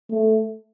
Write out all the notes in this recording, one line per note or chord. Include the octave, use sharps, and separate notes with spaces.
A3